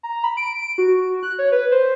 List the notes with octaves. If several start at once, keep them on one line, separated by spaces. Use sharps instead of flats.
A#5
B5
D7
F#4
F#6
C#5
B4
C5